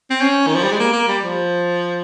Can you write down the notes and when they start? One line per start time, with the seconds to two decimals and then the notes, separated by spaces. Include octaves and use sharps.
0.10 C4
0.21 C#4
0.47 D#3
0.55 F3
0.64 G3
0.72 G#3
0.79 A#3
0.93 A#3
1.08 G3
1.23 F3